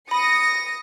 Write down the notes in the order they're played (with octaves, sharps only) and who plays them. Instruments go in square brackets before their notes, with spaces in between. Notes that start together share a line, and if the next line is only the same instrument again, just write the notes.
[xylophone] B5 [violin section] D#6 A#6 C#7